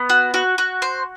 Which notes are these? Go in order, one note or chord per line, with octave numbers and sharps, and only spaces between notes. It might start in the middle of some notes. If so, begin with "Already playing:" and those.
Already playing: B3
F#4
F#4
F#4
C5